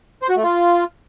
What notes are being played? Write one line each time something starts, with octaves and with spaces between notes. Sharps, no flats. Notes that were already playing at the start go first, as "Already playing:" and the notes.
C5
F#4
A3
F4